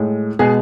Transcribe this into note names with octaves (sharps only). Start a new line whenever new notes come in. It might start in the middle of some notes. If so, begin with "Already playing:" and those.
Already playing: A2 G#3
B2 G#3 G#4